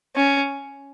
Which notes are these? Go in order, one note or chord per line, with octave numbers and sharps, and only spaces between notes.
C#4